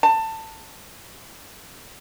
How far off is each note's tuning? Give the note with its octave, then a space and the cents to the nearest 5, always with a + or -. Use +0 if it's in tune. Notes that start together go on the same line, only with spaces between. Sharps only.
A5 +20